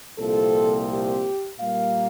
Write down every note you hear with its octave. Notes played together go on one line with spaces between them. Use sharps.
C2 A#2 F3 C4 A4
G4
A#2 G3 A#3 F5